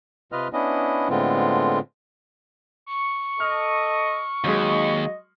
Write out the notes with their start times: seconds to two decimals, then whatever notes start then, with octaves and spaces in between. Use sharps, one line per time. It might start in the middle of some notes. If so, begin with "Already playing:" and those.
0.32 C3 F4 B4 D#5 F6
0.53 B3 C#4 D4 E4 D#5
1.10 A2 D3 G#3 B3 C4 F4
2.86 C#6
3.40 A4 D#5 F6
4.44 D#2 F#3 G#3 D#5